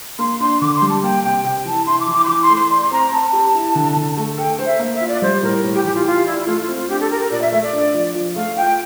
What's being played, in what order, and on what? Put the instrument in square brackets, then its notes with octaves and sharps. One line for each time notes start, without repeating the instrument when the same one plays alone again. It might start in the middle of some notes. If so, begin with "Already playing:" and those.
[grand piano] A#3 [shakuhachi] C6
[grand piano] D4 [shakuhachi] C6
[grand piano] D3 [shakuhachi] D6
[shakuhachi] C6
[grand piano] G3
[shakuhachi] A5
[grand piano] A#3 [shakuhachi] G5
[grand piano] C3 [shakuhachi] G5
[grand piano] C3 [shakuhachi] G5
[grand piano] E3 [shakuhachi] A5
[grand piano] E4 [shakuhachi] C6
[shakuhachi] D6
[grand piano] E3
[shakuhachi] D6
C6
[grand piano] E3 [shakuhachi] D6
[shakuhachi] C6
[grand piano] A3
[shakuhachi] C6
[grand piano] D5 [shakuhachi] C6
[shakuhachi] C6
[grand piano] C4 [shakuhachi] A#5
[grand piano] C4 [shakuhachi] A5
[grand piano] G4
E4
D3
D3
A3
[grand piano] A4 [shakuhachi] G5
[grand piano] C5
[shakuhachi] E5
[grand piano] A#3
[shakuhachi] E5
[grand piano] F4
[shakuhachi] D5
[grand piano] G3 [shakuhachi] C5
[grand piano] A2 [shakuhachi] A#4
[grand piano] A2
[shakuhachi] G4
[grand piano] E3 [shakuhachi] G4
[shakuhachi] F4
[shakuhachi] F4 [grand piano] G4
[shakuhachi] E4 [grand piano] D5
[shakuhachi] E4
[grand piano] A3 [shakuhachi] F4
[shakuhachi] F4
[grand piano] C4
[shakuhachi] F4
[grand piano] D4 [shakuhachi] G4
[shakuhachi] A4
[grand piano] G4 [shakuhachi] A#4
[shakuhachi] A#4
[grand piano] A#2 [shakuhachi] D5
[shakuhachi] E5
[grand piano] A3 [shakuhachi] E5
[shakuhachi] D5
[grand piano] D4
F3
F3
[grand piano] A3 [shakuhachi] F5
[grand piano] F4 [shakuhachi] G5